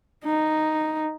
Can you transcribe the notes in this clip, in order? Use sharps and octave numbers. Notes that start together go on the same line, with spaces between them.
D#4